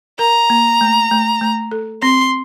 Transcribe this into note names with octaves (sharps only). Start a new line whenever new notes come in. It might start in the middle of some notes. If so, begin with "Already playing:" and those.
A#4 A#5
A#3
A3
A3
A3
A4
C4 C6